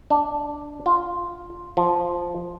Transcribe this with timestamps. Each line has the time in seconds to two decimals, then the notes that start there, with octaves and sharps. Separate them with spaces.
0.10 D4
0.86 F4
1.77 F3